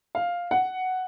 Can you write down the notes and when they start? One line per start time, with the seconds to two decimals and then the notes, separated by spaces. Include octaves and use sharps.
0.15 F5
0.51 F#5